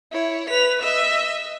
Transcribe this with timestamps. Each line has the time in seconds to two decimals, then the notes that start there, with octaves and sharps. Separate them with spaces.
0.11 E4 C#5
0.50 B4 B6 F7
0.82 D#5 E5 E6